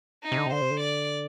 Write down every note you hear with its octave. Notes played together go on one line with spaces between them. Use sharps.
D#4
C3
D3
C3
D3 C5
C3
D3
D5